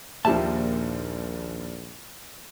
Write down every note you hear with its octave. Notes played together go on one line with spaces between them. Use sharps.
A#1 D#2 A#2 F3 G3 E5 A5